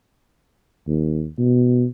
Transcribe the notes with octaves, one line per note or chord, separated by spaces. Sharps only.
D#2
B2